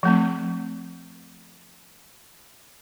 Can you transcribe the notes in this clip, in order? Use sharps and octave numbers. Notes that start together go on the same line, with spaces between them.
F3 A3 C4